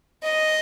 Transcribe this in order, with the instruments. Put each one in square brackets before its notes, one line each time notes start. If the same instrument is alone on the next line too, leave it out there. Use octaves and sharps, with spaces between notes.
[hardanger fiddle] D#5